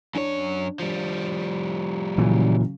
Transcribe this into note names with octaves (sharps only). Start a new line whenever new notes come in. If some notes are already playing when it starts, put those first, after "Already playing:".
F#2 D4 C#5
F3 G3
A#2 C#3 E3 F#3 C#4